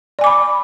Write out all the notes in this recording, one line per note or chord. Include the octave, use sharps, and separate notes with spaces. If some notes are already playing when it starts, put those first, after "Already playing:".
D5 G#5 B5 D6